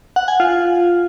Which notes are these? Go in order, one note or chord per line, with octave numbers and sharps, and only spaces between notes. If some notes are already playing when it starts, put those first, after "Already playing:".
F#5
G#5
F4